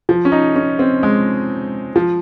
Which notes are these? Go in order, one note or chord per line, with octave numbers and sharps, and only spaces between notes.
F3
C#4
D#4
C#4
C4
G#3
F3